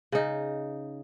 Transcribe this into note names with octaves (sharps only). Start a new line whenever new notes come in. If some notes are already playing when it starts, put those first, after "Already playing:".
C#3 D#4